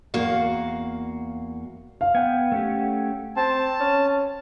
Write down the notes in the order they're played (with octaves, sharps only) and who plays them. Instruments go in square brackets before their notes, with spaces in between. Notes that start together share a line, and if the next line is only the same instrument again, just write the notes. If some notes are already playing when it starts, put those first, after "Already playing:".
[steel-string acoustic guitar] E2 A#3 F#4 F5
[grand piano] F5
[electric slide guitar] B3 [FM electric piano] F#5 G5 G#6
[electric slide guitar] A3 C#4 G4
[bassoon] C4 [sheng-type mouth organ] A5
[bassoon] C#4